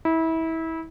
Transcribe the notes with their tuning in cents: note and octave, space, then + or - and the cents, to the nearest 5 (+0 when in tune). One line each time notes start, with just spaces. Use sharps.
E4 -25